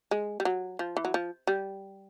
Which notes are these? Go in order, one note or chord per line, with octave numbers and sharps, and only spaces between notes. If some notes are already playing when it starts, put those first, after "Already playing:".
G#3
G3
F#3
F3
E3
F#3
F3
G3